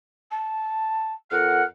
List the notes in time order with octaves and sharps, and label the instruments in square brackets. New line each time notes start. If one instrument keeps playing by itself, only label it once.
[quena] A5
[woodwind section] F2 A#4 F#5 [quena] F6